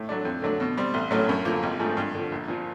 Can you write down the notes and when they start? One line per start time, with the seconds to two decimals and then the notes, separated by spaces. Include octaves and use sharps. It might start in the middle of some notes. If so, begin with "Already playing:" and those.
Already playing: A2
0.09 F#3 A3 D4
0.25 F2
0.42 D3 F#3 A3 D4
0.60 B2
0.77 G3 C4
0.94 A1
1.11 A2 F#3 A3 C#4
1.29 F#2
1.45 D3 F3 A#3
1.63 G#1
1.80 G#2 F3 A3
1.97 G2
2.15 D3 F3
2.32 A#1
2.48 A#2 F3